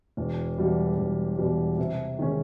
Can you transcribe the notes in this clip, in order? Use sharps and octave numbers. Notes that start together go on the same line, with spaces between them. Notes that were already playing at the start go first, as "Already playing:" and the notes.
E1
E2 B2 G3
E1
E2 B2 G3
C3
D#3 G#3 C#4